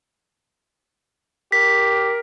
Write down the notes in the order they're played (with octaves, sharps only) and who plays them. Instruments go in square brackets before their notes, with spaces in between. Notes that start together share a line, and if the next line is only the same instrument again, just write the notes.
[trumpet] G4 [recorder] A#4 [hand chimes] B6